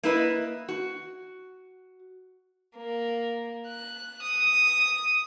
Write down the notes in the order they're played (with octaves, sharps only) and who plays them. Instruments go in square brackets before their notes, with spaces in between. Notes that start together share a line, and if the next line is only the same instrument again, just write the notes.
[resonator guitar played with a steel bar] A#3 E4 B4 D#5
F#4
[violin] A#3
F#6
D#6